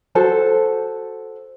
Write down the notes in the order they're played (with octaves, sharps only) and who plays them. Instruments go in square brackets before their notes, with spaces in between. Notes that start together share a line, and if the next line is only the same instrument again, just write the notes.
[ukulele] F#4 A4 C5 A5